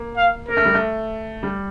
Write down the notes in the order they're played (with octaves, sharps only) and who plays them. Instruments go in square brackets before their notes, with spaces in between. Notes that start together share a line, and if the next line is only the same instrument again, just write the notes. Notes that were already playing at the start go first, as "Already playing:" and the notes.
Already playing: [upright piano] A#3
[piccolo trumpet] F5
[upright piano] A#3 [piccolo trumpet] A#4
[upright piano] A3
G3
A3
G3